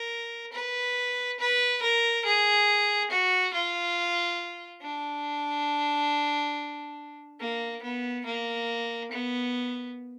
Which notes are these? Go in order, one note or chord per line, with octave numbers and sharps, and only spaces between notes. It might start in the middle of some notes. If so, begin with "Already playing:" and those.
Already playing: A#4
B4
B4
A#4
G#4
F#4
F4
D4
A#3
B3
A#3
B3